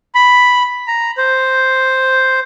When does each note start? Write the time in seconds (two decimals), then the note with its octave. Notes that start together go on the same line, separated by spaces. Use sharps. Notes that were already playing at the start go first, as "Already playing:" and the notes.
0.15 B5
0.87 A#5
1.18 C5